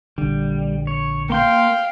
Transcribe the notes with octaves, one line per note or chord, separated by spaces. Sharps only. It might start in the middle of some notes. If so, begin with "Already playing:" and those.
A#1 D3 G3
C#5
A#3 F5 G5 C6 G6